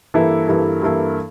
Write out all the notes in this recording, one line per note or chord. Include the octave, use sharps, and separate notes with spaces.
G2 E3 A#3 E4 A4
G2 E3 A#3 E4 A4
G2 E3 A#3 E4 A4